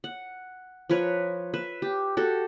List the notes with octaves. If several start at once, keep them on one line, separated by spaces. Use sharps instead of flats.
F#5
F3 A#4 B4 C#5
B4 E5
G4
F#4 G4 A4